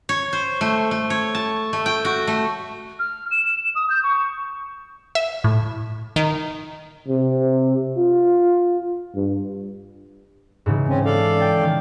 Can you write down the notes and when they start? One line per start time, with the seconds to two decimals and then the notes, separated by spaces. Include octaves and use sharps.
0.09 C#5
0.33 C5
0.61 A3
0.91 A3
1.10 C#5
1.35 A5
1.73 A3
1.86 G5
2.05 F#4
2.28 A3
2.99 F6
3.31 E7
3.75 D#6
3.90 G6
4.03 C#6
5.15 E5
5.44 A2
6.16 D#3
7.08 C3
7.97 F4
9.16 G2
10.66 G#2 C#3 E3
10.88 C4 C#4
11.05 A4 D5 F5
11.40 G5 A6
11.61 D#3